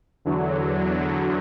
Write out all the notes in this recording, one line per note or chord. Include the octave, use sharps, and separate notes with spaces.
E2 D3 F#3